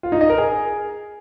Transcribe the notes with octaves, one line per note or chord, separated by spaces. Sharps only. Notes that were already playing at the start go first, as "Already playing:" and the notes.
F4
D#4
D#5
A#4
G#4